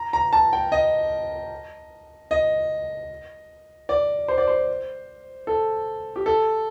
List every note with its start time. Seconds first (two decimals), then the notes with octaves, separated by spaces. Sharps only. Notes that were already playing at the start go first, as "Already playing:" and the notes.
Already playing: A#5
0.13 A#5
0.33 A5
0.53 G5
0.72 D#5
2.31 D#5
3.89 D5
4.28 C5
4.38 D5
4.47 C5
5.47 A4
6.16 G4
6.26 A4